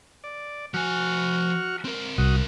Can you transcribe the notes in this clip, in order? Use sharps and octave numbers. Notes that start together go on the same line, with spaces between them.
D5
F3 F#4 G#5 C#6 F6
C4 A#4
C2 F#4 D#6